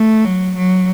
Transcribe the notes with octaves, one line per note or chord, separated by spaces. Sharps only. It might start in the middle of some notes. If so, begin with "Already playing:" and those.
Already playing: A3
F#3
F#3